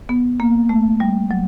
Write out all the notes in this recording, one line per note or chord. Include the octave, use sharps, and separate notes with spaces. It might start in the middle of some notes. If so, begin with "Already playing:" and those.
B3
A#3
A3
G3
F#3